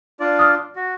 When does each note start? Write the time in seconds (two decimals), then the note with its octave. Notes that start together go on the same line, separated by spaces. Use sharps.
0.20 D4 F4 D5
0.39 D#6 F6
0.76 F#4